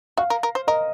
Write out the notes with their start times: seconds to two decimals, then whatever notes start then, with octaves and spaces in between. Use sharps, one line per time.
0.17 F#4 F5
0.30 A#4
0.43 A#4
0.55 C5
0.67 A#4 D#5